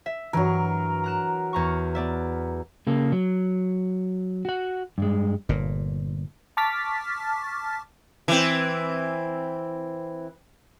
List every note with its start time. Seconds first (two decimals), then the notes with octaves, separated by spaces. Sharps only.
0.06 E5
0.33 G2 E3 F#3 A#4
1.04 A#5 F#6 E7
1.53 E2 A#5 C#6
1.95 B3 D5 E5
2.87 C#3 A#3 A4
3.12 F#3
4.45 F#4 F#5
4.98 G2 G#3
5.49 G1 A#2
6.57 A5 C#6 D6 F6 A6 B6
8.28 E3 C4